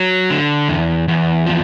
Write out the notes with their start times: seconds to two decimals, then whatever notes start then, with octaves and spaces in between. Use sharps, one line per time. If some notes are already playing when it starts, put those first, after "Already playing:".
Already playing: F#3
0.30 D3
0.69 E2
1.08 E2
1.46 F3